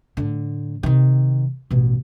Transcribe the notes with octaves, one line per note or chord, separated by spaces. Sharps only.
A2 D3
C3 D#3
A1 B2